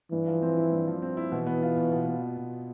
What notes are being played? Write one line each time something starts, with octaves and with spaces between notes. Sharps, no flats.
G2 E3
F3
C4
E4
G2
F3
C4
E4
B2 E3
B3
F4
B2
B2
B3
F4
B2